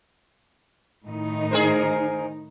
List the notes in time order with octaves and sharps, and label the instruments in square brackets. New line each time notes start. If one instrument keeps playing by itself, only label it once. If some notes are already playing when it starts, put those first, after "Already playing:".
[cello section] A2 D#3 D#4
[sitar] G#4 A#4 C5